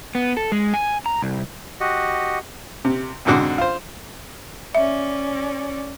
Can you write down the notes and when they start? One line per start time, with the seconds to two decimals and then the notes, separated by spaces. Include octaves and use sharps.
0.15 B3
0.37 A4
0.52 G#3
0.74 G#5
1.06 A#5
1.22 C2
1.80 F#4 G4 D#5 F#5
2.85 C3
3.25 C2 F2 G#2 D3 F#4 D6
3.58 F4 C5
4.75 C#4 D5 E5